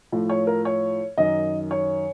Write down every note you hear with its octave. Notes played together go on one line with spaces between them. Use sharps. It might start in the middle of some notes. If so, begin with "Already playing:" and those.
A2 F3
C#5
A#4
C#5
F#2 D#3 D#5
C#5